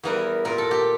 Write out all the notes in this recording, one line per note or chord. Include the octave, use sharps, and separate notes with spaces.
E2 E3 G3 A#4
A#2 G3 A#4
A4
G4